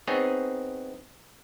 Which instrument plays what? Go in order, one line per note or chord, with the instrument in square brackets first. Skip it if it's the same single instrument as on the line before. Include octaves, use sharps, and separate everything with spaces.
[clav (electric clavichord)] B3 C4 D#4 G#4 C#5